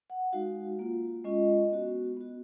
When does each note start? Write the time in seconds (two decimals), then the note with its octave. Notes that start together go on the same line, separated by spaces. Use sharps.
0.10 F#5
0.33 G#3 D#4 F#4 F5
0.79 A#3 F4
1.24 G#3 C#4 F4 D#5
1.70 B3 F#4
2.17 B3 F#4